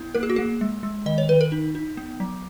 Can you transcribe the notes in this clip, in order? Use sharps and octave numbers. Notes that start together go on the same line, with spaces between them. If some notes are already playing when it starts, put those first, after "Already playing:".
Already playing: B3 E4
A#3 A#4
G#4
F#4
A#3 G#4
G#3
G#3
D#3 D#5
C#5
D#3 B4
A#4
D#4
D#4
B3
F#3